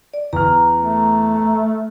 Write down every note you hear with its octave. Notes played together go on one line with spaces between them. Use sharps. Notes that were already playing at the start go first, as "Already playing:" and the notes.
D5
E2 A#5 F6
A3